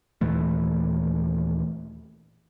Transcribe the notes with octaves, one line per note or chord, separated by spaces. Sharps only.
D#2 A#2 E3 A3